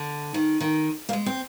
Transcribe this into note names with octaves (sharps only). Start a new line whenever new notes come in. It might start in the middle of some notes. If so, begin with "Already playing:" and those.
Already playing: D3
D#3
D#3
A#3
G#3
C4